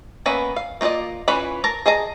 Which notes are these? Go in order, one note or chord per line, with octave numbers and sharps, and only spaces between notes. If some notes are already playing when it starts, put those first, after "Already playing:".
A#3 B3 C#4 B4 E5
F5
A#3 F4 B4 D5 D#5
E3 C#4 F4 B4 B5
A#4 A5 A#5
G#4 D#5 A5 A#5